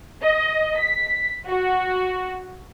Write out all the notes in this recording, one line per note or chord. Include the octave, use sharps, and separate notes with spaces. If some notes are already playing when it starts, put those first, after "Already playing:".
D#5
B6
F#4